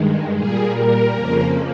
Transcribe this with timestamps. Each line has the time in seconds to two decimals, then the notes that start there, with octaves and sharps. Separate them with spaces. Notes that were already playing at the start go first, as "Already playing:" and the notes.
Already playing: G2 D#3 G#3
0.34 A#2 G3 A#3 G#4
0.74 A#4
1.13 F2 C#3 F3 A#3